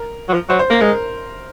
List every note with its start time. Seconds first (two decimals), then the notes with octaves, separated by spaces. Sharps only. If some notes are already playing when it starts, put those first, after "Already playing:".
Already playing: A#4
0.29 F#3
0.33 F3
0.49 F#3 C5
0.59 C5
0.70 A#3 A#4
0.81 G#3 A#4